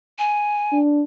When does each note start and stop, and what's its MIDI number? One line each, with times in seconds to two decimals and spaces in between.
0.19 0.78 80
0.73 1.04 62